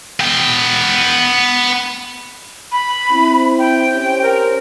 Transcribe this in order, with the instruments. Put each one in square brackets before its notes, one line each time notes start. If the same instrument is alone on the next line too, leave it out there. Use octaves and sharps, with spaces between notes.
[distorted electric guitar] B3 G5
[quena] B5
[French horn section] C4 E4
[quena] G5
[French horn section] C#4 G4 C5
[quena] A#4